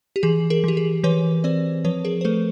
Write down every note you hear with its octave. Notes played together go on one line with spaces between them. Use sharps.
G4
E3 G#4
G#4 A#4
E3 G4
G#4
E3 B4 C#5
C4 C5 D5
F3 B4 C#5
G#4 A#4
C5
A3 A4 B4